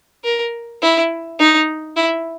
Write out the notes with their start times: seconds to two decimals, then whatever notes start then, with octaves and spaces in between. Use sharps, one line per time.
0.24 A#4
0.82 E4
1.39 D#4
1.96 E4